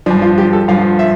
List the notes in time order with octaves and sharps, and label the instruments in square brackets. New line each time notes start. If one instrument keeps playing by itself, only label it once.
[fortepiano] G2 F3 D4
F4
G4
A4
G2 F3 F5
E5